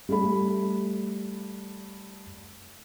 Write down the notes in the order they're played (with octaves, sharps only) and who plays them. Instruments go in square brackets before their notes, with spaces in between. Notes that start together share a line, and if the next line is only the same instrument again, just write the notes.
[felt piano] G3 A3 B5